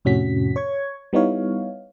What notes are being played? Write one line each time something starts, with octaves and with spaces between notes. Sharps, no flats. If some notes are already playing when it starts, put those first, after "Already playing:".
F2 A2 C3 C#4 F#4 B6
C#5 C#6 G#6
G3 B3 D#4 E4 C#5 F5